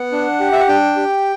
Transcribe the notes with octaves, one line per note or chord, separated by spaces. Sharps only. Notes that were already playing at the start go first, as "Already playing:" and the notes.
Already playing: B3 F#5
D4
G4
E5
F#5
D4 G5
G4